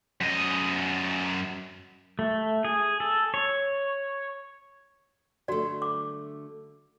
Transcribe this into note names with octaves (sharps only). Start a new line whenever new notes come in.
F#2 D#5
A3
G#4
A4
C#5
D3 A3 F#4 D5
D6